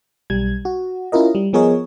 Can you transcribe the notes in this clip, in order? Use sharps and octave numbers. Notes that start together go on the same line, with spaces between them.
B1 G3 G#6
F#4
C#4 E4 F4 A#4 D#5
G3
F3 B3 G#4 A#4 C#5 D#5